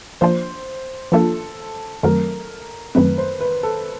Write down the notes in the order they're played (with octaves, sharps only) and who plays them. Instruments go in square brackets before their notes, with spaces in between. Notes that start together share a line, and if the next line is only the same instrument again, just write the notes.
[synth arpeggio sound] F3 A#3 D4 F4 [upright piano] C5
[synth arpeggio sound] F3 A#3 D4 F4 [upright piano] A4
[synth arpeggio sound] F#2 D#3 F#3 A3 C4 [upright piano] A#4
[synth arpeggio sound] F#2 D#3 F#3 A3 C4 [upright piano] B4
[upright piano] C5
B4
A4